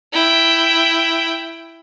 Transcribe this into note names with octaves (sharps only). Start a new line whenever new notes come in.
E4 G5